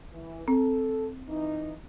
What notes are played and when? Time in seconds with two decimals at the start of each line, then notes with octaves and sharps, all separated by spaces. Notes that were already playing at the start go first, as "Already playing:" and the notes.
0.13 E3
0.48 C4 A4
1.28 E3 D#4